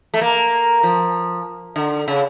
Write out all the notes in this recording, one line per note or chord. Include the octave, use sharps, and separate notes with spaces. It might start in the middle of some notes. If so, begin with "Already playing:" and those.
A3
A#3
F3
D3
C#3